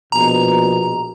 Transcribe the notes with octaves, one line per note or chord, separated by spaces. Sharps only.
A#1 B2 A#5